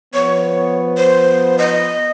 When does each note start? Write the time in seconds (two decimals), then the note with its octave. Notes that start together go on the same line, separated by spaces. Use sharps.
0.14 F3 B3 C#5
0.97 C5
1.58 D#5